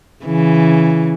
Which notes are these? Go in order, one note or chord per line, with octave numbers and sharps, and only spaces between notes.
C#3 E3